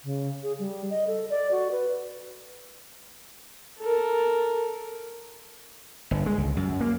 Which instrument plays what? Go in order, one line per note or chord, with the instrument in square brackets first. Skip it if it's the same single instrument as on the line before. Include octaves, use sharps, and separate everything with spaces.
[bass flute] C#3
G#4
G3
D#5
A4
D5
F#4
B4
[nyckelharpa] A4 A#4
[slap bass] G1
G#3
C#2
F#2
A#3